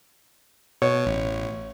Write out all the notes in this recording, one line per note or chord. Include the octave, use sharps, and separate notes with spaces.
B2 C#5
A1